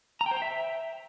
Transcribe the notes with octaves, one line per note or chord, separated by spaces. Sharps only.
A#5
G5
C5
G5
E5